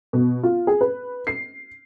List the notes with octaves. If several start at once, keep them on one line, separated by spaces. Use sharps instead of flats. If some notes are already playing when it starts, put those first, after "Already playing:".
B2
F4
G#4
B4
C7